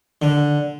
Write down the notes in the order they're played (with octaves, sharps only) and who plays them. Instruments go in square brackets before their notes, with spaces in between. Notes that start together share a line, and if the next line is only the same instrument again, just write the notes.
[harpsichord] D3